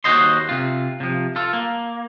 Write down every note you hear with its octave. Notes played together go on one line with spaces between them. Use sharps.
D#2 A#2 F#4 C5 D#5 C6
C3 F4
C3 F3
F4 A4
A#3